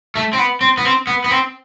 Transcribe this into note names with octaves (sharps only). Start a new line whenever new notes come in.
A3
C4
B3
C4
B3
C4
B3
B3
C4